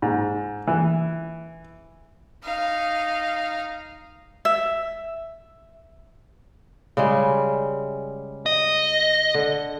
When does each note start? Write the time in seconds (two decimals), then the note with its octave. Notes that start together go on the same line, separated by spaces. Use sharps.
0.02 G#2
0.67 E3
2.44 D#4 F5
4.45 E5
6.97 C#3 G3 G#3
8.46 D#5
9.35 D3